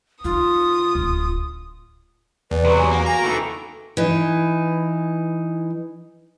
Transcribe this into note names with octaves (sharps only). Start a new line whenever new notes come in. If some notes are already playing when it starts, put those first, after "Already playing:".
D#3 F4 D#6
D1
E2 B4 D5
C3 F#3 B5
G4 G#5
A#3 F#4
F#4 G#5 A#5
D#3 E3 A4
E3 D#4